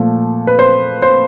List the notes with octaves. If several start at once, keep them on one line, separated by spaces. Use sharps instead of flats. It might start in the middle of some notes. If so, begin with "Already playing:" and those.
Already playing: A#2 F3 A3
B4
C5
C5